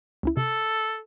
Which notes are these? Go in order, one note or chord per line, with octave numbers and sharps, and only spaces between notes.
C#2 C#4 E4
C3 A4